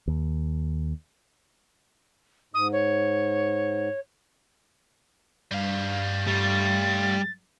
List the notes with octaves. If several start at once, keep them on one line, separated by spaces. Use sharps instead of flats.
D#2
G#2 D#6
C#5
G2 G3 F5
G3 A3 F4 A6